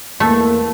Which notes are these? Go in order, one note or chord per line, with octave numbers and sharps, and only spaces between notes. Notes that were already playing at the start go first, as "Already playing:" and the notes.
E2 E3 A3 A#3